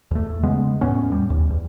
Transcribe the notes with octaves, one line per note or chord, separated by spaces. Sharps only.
E2 A3
C#3 G#3 B3
E2 A2 B3 C#4
G3
D#2
E2